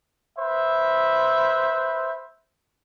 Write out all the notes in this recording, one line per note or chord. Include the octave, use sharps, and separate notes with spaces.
B4 C5 E5